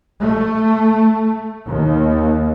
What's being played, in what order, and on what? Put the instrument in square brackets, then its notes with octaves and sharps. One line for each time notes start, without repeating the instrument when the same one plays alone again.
[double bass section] A3
D#2